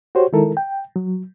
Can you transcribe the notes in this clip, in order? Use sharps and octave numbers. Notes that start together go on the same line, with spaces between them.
F#4 G4 C5 C#5
D#3 G#3 E4 A4 A#4
G5
F#3